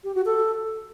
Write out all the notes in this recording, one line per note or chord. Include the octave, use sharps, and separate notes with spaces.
G4
F#4
A4